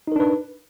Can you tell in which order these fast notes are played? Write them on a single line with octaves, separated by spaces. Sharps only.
D#4 A#4 D4 B4